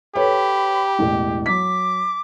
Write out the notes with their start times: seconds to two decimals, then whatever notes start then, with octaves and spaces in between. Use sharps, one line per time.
0.16 G4 A4 B4 C#5 B5
0.99 E1 A1
1.46 F#3 D6 B6